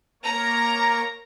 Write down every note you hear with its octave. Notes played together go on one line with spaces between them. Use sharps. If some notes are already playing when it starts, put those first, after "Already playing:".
A#3 A#4 C#5 A#5